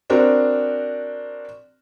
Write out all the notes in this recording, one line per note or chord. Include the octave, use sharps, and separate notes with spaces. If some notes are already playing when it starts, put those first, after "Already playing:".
C4 D4 F#4 A#4